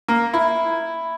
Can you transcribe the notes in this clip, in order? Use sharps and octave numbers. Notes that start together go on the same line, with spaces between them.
A#3
E4